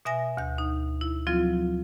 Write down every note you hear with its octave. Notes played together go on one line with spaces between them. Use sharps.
B2 E5 G#5 A#6
D2 G6
D#4
E4
F3 F#3 C4 F4